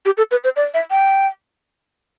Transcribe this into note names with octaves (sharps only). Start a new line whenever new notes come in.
G4
A4
B4
C5
D5
E5
G5